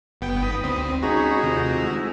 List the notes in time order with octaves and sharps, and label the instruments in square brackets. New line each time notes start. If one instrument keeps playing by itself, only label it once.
[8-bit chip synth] G1 B3 G5
[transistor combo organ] D#4 B5 D#6
[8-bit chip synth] D2 C4
[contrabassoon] G#1 [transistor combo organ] C#4 B5 [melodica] D#4 G#4 A#5 [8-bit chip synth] F#4
[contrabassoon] F1 [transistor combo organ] D#2 C3 D#3
[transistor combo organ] G#3 E4